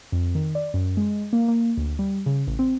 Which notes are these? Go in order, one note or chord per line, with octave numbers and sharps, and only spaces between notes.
F2
D#3
D5
F#2
G#3
A#3
A#3
D2
G3
C#3
A1
C4